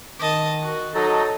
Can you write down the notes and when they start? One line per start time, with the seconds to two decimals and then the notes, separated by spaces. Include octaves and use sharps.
0.19 D#3 D#5 A5
0.63 F#4
0.95 F#3 D#4 A4 D#5 A5